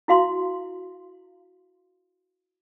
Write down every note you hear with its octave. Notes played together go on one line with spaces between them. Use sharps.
E4 F#4 F5 C6